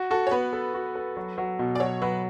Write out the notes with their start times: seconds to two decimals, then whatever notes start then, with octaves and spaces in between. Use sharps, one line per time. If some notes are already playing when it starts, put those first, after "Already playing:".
Already playing: F#4
0.11 F#4 A4
0.27 C#5
0.31 B3 B4
0.53 A4
0.74 F#4
0.95 A4
1.17 F#3
1.38 F#3
1.59 B2
1.75 D5
1.80 F#3 C#5
2.02 F#3 B4